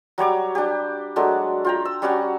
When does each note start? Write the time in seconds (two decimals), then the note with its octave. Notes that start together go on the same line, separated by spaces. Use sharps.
0.18 F#3 G3 C#5 D6
0.55 D4 G4
1.16 F#3 G#3 A3 D4
1.64 F4 G5 A#5
1.85 E6
2.02 G3 C#4 F#4 F#5